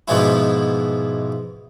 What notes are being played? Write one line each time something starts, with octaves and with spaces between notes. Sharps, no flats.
G#2 B2 E3 F3 G#3 E4